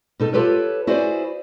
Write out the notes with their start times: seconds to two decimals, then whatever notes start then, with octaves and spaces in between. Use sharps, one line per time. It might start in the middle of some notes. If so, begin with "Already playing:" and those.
0.20 B2 D#4 A4
0.33 F4 G4 A4 B4 C#5
0.87 E4 F#4 G#4 C5 D5